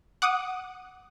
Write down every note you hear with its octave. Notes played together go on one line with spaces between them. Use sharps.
F#5 D6 D#6